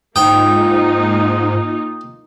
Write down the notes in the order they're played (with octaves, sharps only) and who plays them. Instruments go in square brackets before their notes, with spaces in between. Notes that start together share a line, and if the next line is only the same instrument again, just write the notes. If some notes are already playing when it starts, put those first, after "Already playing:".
[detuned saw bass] G#2 [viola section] A#3 D#4 F4 [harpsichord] G5 [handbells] D#6